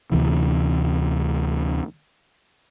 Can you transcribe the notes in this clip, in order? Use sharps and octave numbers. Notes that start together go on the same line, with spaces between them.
D2 C3 E3